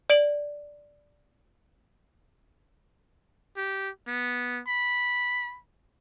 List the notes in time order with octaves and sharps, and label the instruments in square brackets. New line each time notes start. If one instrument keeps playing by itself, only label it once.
[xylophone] D5 D7 F#7
[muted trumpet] G4
B3
B5